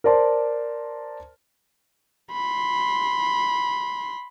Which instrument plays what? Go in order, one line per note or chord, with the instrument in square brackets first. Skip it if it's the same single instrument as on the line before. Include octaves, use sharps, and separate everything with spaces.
[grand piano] A#4 C5 D5 A5 C6
[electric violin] B5 C6